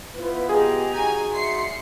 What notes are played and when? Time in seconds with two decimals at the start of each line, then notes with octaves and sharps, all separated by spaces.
0.14 B3 E4 F4 B4 C5
0.49 G4 G#4 D#5 A#5
0.93 D#4 F#4 G#5
1.32 D5 E5 C6 C7 C#7